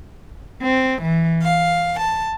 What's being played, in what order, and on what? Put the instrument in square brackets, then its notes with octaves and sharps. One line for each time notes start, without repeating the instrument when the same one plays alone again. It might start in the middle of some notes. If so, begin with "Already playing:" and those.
[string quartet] C4
E3
F5
A5